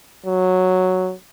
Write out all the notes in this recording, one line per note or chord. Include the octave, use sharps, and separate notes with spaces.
F#3